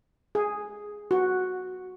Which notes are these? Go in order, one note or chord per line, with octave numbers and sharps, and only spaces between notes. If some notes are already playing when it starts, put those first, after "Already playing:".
G#4
F#4